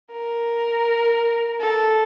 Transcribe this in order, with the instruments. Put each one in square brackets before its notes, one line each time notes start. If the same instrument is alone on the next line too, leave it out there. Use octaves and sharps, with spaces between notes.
[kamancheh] A#4
A4